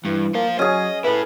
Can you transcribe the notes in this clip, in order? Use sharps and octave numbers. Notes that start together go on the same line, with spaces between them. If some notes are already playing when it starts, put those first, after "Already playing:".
G2 E3
A#3 C5 F5
F#3 C#4 G#4 D#5
E4 A4 B4